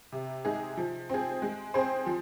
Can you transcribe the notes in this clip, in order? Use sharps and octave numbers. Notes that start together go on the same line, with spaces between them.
C3
G#3 D#4 G#4
F3
C4 G#4
G#3
C4 G#4 C5
F3